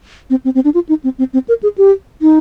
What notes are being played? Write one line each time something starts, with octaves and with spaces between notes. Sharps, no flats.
C4
C4
C4
D4
F4
D#4
C4
C4
C4
A#4
G#4
G4
D#4